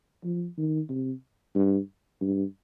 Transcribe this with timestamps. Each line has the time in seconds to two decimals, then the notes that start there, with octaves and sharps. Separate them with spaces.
0.24 F3
0.57 D#3
0.89 C3
1.55 G2
2.21 G2